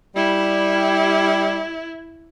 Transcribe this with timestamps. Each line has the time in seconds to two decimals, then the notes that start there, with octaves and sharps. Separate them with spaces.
0.16 G3 E4